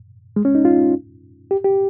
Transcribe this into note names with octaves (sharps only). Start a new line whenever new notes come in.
G#3
C#4
D#4
F4
G4
G4